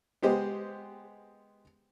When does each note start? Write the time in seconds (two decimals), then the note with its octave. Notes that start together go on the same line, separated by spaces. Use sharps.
0.22 G#3 B3 G4 C5 D#5